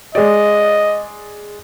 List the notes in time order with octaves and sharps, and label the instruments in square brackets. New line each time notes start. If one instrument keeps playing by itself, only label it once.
[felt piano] G#3 D5 [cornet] D#5